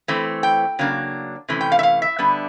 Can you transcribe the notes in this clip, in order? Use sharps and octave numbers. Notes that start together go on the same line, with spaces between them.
E3 A3 C4
G5
C#3 F#3 A#3 D4
C3 E3 A3 C#4
G5
F5
E5
F5
E5
D3 G3 B3 D4